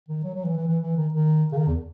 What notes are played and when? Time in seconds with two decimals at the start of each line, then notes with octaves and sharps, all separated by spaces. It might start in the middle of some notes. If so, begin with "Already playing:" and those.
0.09 D#3
0.24 F#3
0.35 F#3
0.45 E3
0.57 E3
0.67 E3
0.83 E3
0.97 D#3
1.13 D#3
1.52 C#3
1.57 D#3
1.68 E2